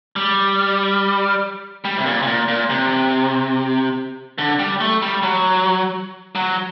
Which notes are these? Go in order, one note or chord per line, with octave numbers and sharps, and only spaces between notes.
G3
G3
C3
A#2
C3
A#2
A#2
C3
D3
G3
A3
G3
F#3
F#3